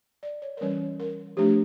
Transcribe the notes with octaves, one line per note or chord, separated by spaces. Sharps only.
D5
C#5
A#4
E3 G3 C#4 C#5
A#4
F3 A3 D4 G4